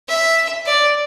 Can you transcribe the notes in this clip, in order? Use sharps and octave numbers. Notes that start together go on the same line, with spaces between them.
E5
D5